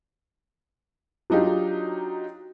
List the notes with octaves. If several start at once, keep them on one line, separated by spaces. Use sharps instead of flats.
F#3 D4 D#4 F4 G4